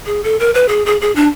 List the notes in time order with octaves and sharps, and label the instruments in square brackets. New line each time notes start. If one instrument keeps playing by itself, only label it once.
[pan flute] G#4
A4
A#4
B4
G#4
G#4
G#4
D4